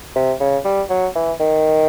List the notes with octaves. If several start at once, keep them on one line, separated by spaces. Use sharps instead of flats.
C3
C#3
G3
F#3
E3
D#3